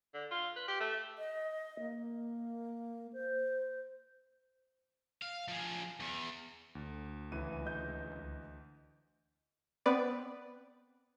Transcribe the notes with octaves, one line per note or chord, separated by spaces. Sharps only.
D3
F4
B4
G4
A3
D#5
A#3
C5
F5
F3 G#4
E2
D2
C#2 E3 D#7
D#5 G6
B3 C4 B4 D5